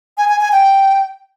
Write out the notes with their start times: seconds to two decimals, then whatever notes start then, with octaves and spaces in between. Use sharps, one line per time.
0.18 G#5
0.29 G#5
0.41 G#5
0.52 G5